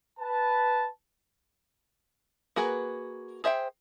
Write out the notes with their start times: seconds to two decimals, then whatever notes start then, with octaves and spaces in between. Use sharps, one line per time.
0.20 B4 A5
2.56 A#3 F#4 G#4 B4
3.44 G#4 C5 E5 F#5 G5